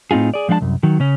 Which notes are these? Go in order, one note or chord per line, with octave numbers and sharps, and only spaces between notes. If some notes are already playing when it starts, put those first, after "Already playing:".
A2 C4 D#4 F4 G#4
G#4 D5
F3 G#3 D4 F5 A5
C2 F#2
D#3 F#3
C#3 C#4